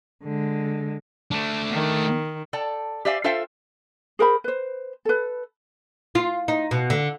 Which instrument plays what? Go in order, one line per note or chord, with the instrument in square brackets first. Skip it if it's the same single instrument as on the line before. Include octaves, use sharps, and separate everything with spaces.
[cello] D3 G#3
[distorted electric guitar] A3 D4
[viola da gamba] D#3
[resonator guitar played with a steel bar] A4 D5 G5 A5
G4 C5 D5 E5 F5 G#5
F4 A4 C5 E5 F5 G5
[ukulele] G#4 A#4 C5 B5
B4 C5
A4 B4
[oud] F4
D#4
B2
D3